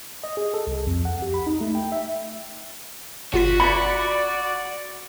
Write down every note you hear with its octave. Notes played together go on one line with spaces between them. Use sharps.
D#5
G#4
A4
C2
F2
F#5
G4
B5
D#4
A3
G5
E5
G1 F4 F#4 B6
D5 B5